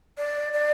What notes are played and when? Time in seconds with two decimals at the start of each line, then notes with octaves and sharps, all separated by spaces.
0.18 D5
0.53 D5